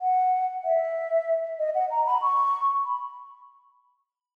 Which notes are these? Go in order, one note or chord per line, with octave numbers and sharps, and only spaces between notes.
F#5
E5
D#5
F#5
A#5
B5
C#6
B5